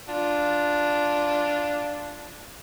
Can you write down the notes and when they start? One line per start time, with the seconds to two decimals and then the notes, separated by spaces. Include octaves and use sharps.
0.09 D4 F4